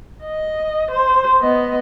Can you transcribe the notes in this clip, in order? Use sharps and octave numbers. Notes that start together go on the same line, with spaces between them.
D#5
C5
B3 D#5